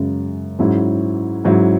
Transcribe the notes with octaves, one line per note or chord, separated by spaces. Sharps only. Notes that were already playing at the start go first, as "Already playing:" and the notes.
Already playing: F#2 C#3 G#3
G#2 F#3 C#4 E4
G#2 F#3 C#4 E4